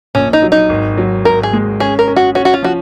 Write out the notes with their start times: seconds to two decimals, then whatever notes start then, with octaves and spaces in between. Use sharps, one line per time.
0.15 A#1 C#4
0.33 D#4
0.42 F#3
0.52 D#4
0.69 G#1
0.97 F#3
1.25 G#1 A#4
1.43 G#4
1.53 G#3
1.80 C#4 G#4
1.99 A#4
2.08 C#4
2.16 F#4
2.35 C#4 F#4
2.45 F#4
2.54 F4
2.63 F3 F#4